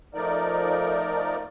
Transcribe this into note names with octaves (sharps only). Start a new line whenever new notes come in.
F3 A3 D#4 A#4 D5